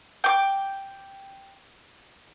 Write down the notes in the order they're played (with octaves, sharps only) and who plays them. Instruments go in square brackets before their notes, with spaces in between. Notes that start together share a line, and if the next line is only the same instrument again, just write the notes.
[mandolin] G5 D6